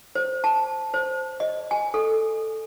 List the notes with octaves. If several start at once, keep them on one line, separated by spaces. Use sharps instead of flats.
C5
A5
C5
D#5
G#5
A4